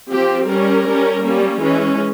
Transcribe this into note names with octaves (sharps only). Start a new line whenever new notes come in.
F3 C4 G4
G3 C#4 A#4
G3 C#4
G3 A#3 C#4
E3 G#3 C#4